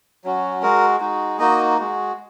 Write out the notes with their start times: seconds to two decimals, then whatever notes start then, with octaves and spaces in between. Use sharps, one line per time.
0.24 F#3 C#4 F#4
0.62 G#3 F#4 A#4
1.00 G#3 D#4 F#4
1.39 A#3 D#4 F#4 D#5
1.78 G#3 F#4